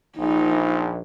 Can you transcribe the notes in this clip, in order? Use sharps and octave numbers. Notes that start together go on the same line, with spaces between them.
A#1 D#4